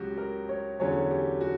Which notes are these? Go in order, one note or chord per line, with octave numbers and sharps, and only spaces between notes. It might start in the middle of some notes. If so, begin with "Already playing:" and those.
Already playing: C#2 C#3 F#3 F#4 G4
A#4
C#5
E2 D3 F#3 C#4 C#5
G4
F#4